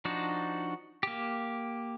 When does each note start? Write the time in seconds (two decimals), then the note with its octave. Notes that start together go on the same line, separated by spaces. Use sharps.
0.05 F3 D4 D#4 F#4
1.03 A#3 G4